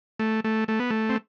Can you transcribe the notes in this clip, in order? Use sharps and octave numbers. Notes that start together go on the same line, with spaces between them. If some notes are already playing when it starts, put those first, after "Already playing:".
A3
A3
A3
B3
A3
C4